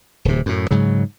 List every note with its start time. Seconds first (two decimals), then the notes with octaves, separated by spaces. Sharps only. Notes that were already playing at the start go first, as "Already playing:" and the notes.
0.25 D1 C3
0.46 F#2 A2
0.71 G#2 C#3 F#3